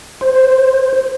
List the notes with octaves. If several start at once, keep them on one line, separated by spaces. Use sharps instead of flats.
C5